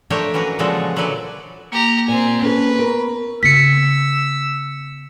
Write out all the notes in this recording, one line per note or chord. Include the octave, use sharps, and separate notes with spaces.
F3 A3 D4 G4 A#4 C#5
E3 F#3 C#4 A#4 B4
A#2 C#3 F3 G#3 F#4 A4
D3 F#3 E4 A4 B4 D5
A#3 G4 A#5
A#2 C4 G#5
C#4 A4 B4
B3 A#4 B5 C#6
C#3 B3 E6 B6 C#7